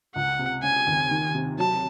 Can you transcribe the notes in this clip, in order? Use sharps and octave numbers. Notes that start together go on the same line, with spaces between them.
C#2 F#5
C3
C#3 G#5
D#2
D#3
C3
F#3 A5